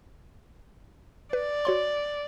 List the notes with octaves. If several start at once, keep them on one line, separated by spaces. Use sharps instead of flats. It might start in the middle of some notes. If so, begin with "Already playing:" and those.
B4 D5
F#4 C#5 C6